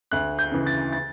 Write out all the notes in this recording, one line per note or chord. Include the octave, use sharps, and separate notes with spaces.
D2 F#6
G6
C#3 E3
A6
A6